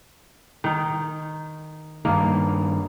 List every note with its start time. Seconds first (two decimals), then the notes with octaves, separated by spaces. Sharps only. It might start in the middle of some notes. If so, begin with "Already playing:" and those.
0.64 D#3 D#4
2.05 G2 D#3 A#3